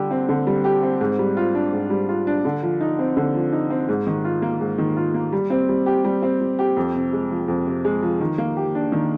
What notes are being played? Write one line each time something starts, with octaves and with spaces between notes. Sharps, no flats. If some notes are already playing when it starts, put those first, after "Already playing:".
Already playing: D3 G3 G4
C4
D3
G3
G4
C4
G#2
G3
F4
D4
G#2
G3
F4
D4
D3
F3
D#4
C4
D3
F3
D#4
C4
G#2
D#3
F4
A#3
G#2
D#3
F4
A#3
G3
C4
G3
G4
G3
C4
G3
G4
F2
C3
G#3
F3
F2
C3
G#3
F3
D#3
A#3
G4
D4
D#3